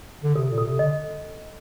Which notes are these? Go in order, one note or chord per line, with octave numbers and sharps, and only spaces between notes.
D3
C3 A4
A#2
A4
C3
D3 D#5